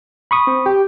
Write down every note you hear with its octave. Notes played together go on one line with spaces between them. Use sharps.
B5 C#6 D#6
C4
G4